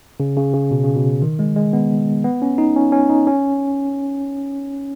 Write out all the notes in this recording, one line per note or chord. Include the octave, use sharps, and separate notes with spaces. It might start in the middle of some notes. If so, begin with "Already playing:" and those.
C#3
C#3
C#3
B2
C#3
B2
D#3
G#3
G#3
B3
B3
C#4
D#4
C#4
C#4
D#4
C#4